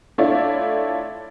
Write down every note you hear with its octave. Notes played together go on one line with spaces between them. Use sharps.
A3 D4 E4 F4 C#5 D5